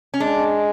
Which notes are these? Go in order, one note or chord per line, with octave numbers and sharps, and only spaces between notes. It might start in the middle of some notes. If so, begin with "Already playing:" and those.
C#4
G#3 D4